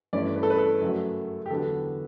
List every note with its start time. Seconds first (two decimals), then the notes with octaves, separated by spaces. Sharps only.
0.13 G2 E3 A3 C#4 D5
0.36 B4
0.43 A4
0.50 B4
0.58 A4
0.81 F#2 C#3 F#3 A3
1.46 G4
1.50 E2 D3 F#3 B3 D4 A4